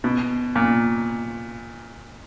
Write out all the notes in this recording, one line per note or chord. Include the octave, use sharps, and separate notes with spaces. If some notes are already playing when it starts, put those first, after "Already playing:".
B2
A#2